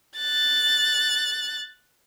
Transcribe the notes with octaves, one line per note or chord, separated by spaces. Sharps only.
F#6 A6